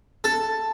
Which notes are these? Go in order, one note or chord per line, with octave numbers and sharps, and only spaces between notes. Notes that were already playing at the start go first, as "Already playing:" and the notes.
A4